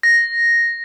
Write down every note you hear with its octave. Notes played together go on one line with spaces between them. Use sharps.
A#6